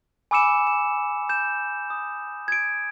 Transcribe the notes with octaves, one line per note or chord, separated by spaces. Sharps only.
G#5 B5 D6 E6 C#7 E7
E7
G6 E7
D#6
G#6 D7